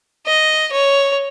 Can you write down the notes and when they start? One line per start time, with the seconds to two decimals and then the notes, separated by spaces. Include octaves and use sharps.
0.26 D#5
0.72 C#5